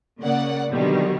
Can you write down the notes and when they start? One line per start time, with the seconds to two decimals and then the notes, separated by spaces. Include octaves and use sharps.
0.21 C#3 A#3 D5 F#5
0.73 B2 D3 D#3 F#3 G3